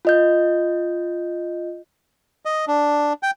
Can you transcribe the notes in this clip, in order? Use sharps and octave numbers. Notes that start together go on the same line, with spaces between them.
F4 D#5 G6
D#5
D4
G5